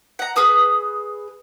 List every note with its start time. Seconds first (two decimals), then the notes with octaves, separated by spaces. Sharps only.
0.19 F#5 A#5
0.36 G#4 B4 D#6 F6